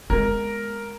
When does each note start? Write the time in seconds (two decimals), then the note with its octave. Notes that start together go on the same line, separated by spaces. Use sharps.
0.10 G#3 B3 A#4